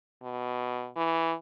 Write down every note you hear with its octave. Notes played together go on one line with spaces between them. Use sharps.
B2
E3